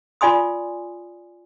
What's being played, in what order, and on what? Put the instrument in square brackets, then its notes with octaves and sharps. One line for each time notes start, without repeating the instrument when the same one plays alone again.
[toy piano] F4 D5 G#5 C6 D#6